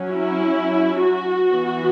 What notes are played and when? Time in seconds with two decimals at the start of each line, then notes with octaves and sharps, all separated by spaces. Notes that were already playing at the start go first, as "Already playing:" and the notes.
Already playing: F#3 C#4
0.10 E4
1.04 F#4
1.51 E3 B3